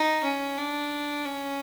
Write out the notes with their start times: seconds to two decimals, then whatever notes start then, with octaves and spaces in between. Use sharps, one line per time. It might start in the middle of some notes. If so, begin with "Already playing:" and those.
Already playing: D#4
0.23 C#4
0.58 D4
1.25 C#4